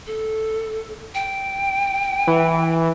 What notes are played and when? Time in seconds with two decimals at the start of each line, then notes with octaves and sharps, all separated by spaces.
0.07 A4
1.15 G5
2.27 E3